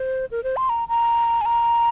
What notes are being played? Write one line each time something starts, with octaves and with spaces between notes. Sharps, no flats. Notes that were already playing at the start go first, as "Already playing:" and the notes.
Already playing: C5
A#4
C5
C6
A#5
A#5
G#5
A#5